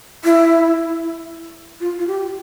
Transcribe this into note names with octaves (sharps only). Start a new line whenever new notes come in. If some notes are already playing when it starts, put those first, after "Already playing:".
E4
F4
F4
G4